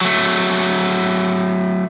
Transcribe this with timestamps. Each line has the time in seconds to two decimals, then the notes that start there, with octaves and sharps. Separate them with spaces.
0.01 F#3 A3